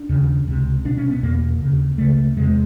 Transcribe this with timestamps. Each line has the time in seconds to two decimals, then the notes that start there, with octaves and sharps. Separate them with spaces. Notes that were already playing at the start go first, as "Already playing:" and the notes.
Already playing: D4
0.09 D#2 C#3
0.47 C#2 C3
0.85 C2 B2 D4
0.97 C#4
1.10 B3
1.23 E2 B2 A#3
1.60 D#2 C#3
1.98 C#2 C#3 A3
2.36 E2 C3 G#3